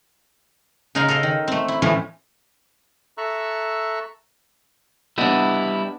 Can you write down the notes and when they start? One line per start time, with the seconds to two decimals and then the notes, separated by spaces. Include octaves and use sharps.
0.95 C#3 D#4 A#4 F#5 G#5 C6
1.08 A4 A#4 D#5 F5
1.23 D#3
1.48 A3 C4
1.68 E4
1.82 A2 E3 F3 A3 C#4 E4
3.18 A4 E5 A#5 C#6 E6 F#6
5.18 G3 B3 D4 E4 D#5